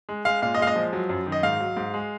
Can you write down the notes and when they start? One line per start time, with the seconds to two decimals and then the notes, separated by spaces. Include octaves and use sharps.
0.09 G#3
0.25 G#3 F5
0.42 A#2 F5
0.55 D#5
0.59 G#3 F5
0.67 D#5
0.76 F3
0.93 F#3
1.09 F#2
1.26 D#3
1.32 D#5
1.43 G#2 F5
1.60 F#3
1.77 G#2
1.94 G#3